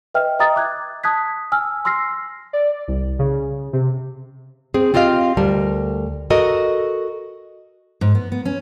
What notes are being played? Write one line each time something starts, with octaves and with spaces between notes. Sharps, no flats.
B4 D#5 E5 G5 F6
D#5 E5 G5 A#5 D#6 A6
D6 F#6 G#6
A5 D#6 F#6 G#6 B6
G#5 E6 F6
C6 E6 F6 A#6 C7
D5
C2
C#3
C3
C4 G#4
C4 F4 G4 D#5 F5
D2 G3 A#4 A5
F#4 A4 A#4 D#5
G#2
B3
B3
C#4